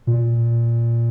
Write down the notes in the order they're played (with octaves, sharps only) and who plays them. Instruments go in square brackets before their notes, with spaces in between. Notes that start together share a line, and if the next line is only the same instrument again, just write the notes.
[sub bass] A#2